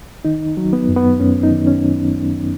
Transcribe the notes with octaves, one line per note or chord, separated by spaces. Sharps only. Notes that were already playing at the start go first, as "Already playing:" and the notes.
D#3 D#4
F#3
B3
F#2
B3
F#2 C#4
D#4
D#3
C#4